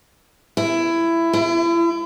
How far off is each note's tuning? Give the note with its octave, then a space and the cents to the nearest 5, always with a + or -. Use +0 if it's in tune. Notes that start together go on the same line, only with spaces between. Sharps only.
E4 +15
E4 +40